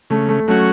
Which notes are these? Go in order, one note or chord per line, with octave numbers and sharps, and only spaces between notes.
C#3 A3
A3
F#3 A3 C#4 F#4